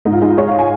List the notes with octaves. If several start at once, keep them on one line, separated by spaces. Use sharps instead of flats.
G#2 D#4
F4
G#3 D#4
F4
G#3 C#5
F5
G#5